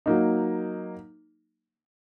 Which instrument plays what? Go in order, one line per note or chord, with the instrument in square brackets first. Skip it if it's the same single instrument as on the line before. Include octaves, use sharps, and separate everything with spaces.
[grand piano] F#3 A#3 D#4